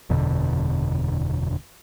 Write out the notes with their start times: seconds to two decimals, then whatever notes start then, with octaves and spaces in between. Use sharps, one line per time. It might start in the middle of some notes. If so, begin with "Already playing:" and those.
0.10 F#1 E2 B2 D3